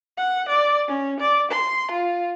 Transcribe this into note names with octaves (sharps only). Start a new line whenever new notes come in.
F#5
D5
C#4
D5
C6
F4